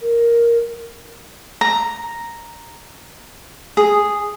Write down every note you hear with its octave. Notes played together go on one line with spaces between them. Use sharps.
A#4
A#5
G#4